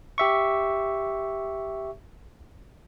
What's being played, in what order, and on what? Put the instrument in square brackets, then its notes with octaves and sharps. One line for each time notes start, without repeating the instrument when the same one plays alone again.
[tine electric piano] G4 E5 C#6